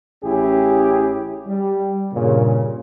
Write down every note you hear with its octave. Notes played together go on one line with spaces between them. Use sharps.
A1 C#4 E4 G4 G#4
G3
G2 A#2 C#3